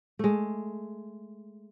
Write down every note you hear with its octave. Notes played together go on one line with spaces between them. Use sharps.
G#3 A3